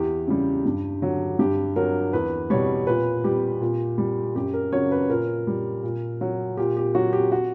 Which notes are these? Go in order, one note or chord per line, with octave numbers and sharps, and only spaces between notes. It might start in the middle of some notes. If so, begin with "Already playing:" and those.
Already playing: E2 G4
C#3 G3
G2
D3 F#3
G2 G4
F#3 A#4
E2 B4
B2 G3 C#5
A#2 B4
G3 G4
A#2
G3
F#2 G4
A#4
C#3 F#3 C#5
B4
A#2 A#4
G3
A#2
F#3
A#2 G4
G4
F#3 F#4
G4
F#4